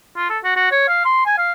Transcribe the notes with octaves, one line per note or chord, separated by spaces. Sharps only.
F4
A4
F#4
F#4
C#5
F5
C6
G#5
F5